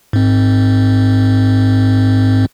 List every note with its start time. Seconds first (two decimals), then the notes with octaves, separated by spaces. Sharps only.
0.13 G#2 C4